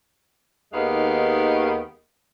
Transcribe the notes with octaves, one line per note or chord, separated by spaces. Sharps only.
D#2 D#3 G#3 B3 G4 F5